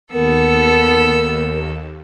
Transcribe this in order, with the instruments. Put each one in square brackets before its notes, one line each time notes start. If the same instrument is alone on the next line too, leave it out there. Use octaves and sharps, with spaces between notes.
[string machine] D#2 [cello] B3 [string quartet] A4 E6 [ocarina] A#4